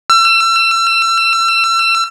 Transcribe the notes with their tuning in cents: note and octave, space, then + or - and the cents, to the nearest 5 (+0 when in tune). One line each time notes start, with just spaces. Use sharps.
E6 +35